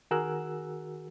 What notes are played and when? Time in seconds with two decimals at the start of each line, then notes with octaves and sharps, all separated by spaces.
0.11 D#3 F#4 G#4 A#4 E6 F#6